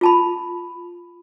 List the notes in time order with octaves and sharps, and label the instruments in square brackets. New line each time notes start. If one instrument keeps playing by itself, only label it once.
[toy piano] F4 A5 B5